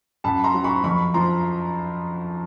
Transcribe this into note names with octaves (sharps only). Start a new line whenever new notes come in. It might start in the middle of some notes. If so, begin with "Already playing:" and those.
F#2 A5 B5
A#5 C6
F#3
B5 C#6
F2 B5 C#6
F3 A#5 C6